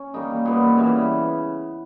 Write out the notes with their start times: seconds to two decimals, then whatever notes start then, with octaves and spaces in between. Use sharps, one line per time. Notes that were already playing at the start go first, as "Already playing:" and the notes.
Already playing: C#4
0.14 D#3 G3 A#3 D#4
0.45 A#2 G3 B3
0.77 C#3 E3 G3